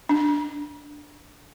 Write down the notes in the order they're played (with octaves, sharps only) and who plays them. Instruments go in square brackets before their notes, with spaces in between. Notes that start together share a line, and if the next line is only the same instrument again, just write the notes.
[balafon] D4